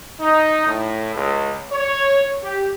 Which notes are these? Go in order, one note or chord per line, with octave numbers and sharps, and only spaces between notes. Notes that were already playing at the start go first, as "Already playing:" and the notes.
D#4
A2
C#2
C#5
G4